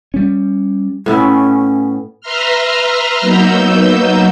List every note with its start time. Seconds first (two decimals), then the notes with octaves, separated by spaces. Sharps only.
0.14 G3 C#4
1.06 A2 B3 C#4 E4
2.21 B4 E5 A#5 C6 F6
3.21 F#3 A#3 B3 D#4 E6 G6